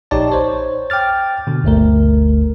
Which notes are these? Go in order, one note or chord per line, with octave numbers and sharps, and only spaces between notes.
A#1 D#4 G4 C#5 D5 A5
C5 C#5
G5 D6 F6 A6
B2 D3
G1 D2 A3 A#4